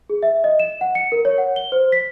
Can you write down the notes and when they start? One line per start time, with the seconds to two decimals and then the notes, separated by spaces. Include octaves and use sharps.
0.10 G#4
0.23 E5
0.44 D#5
0.60 E7
0.81 F#5
0.95 C#7
1.12 A#4
1.25 C#5
1.38 F#5
1.56 G7
1.72 C5
1.92 B6